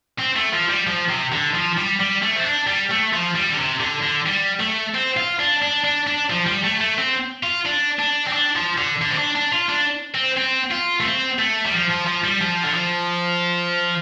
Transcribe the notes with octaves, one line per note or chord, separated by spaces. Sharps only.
C4
A3
F3
G3
F3
C3
D3
F3
G3
G3
A3
C4
D4
G3
A3
F3
G3
D3
C3
D3
D3
G3
A3
C4
F4
D4
D4
D4
D4
F3
G3
A3
A3
C4
F4
D4
D4
C4
D4
F3
D3
D3
C4
D4
D4
F4
D4
C4
C4
F4
A3
C4
A3
G3
F3
F3
F3
G3
F3
D3
F3